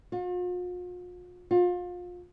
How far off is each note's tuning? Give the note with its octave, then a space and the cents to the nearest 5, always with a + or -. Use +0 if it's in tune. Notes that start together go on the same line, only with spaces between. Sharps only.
F4 +45
F4 +30